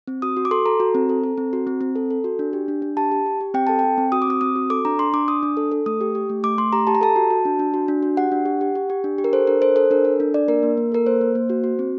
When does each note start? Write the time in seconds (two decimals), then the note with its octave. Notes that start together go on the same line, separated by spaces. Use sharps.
0.07 C4
0.22 F#4 D#6
0.37 F#4
0.45 D6
0.51 A4 C6
0.66 A4 A#5
0.80 F#4
0.95 C4
1.09 A4
1.24 A4
1.38 C4
1.53 F#4
1.67 C4
1.81 C4
1.96 A4
2.11 A4
2.24 F#4
2.39 D4
2.53 G4
2.68 D4
2.82 D4
2.97 G4 A5
3.12 G4
3.26 G4
3.41 G4
3.54 C4 G5
3.67 A4 A5
3.79 G5
3.84 C4
3.98 C4
4.12 F#4 D#6
4.22 D6
4.27 C4 D#6
4.41 C4 D#6
4.56 F#4
4.70 A4 D6
4.85 D4 A#5
4.99 D4 C6
5.13 D4 D6
5.28 D4 D#6
5.43 D4
5.57 A4
5.72 A4
5.86 A3 D#6
6.01 G4
6.15 G4
6.30 A3
6.43 A3 D6
6.58 A3 C6
6.73 G4 A#5
6.87 G4 A5
6.95 A#5
7.01 A4 A5
7.16 F#4
7.30 F#4
7.45 D4
7.59 D4
7.74 F#4
7.88 D4
8.03 F#4
8.17 G4 F#5
8.32 D4
8.46 G4
8.61 G4
8.75 G4
8.90 G4
9.04 D4
9.18 G4
9.24 A#4
9.33 A4 C5
9.47 D4 A#4
9.62 A4 C5
9.76 A4 C5
9.91 D4 A#4
10.05 A4
10.20 D4
10.34 D4 D5
10.48 A#3 A#4
10.63 A#3
10.77 A#3
10.92 A4 A#4
11.06 A#3 C5
11.21 A#3
11.35 A#3
11.50 F#4
11.64 F#4
11.79 C4